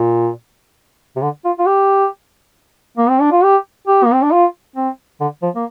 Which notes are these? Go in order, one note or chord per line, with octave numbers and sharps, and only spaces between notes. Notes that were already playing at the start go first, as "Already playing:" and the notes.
Already playing: A#2
C3
D3
F4
F4
G4
A#3
C4
D4
F4
G4
G4
A#3
C4
D4
F4
C4
D3
F3
A#3